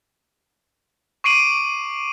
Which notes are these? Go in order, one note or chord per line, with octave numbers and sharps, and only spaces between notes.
C#6 D6 C7 D7 D#7 F#7